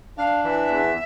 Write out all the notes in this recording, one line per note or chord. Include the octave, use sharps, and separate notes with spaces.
D4 F5
E3 E5
E2